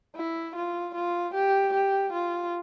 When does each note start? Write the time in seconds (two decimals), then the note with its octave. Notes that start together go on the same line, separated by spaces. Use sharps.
0.16 E4
0.56 F4
0.94 F4
1.34 G4
1.74 G4
2.13 F4